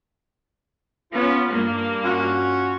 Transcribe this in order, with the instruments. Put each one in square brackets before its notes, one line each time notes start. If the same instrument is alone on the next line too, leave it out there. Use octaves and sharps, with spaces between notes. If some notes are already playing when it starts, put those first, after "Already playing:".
[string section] B3 C#4 [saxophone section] F4
[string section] G2 A#3
[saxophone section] C#4 F4 F#4